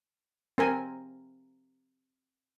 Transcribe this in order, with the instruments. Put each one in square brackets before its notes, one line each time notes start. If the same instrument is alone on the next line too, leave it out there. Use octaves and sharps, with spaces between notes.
[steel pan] C4 A#4 G#5